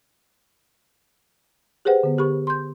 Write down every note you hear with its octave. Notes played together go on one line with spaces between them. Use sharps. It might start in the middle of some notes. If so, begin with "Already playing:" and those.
G4 G#4 B4 C5 F#5 G5
D3 B3
D3 G4 A#4 B5 C#6
C6 G6